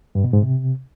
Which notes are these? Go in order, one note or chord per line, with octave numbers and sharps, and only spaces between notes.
G2
B2
G#2
C3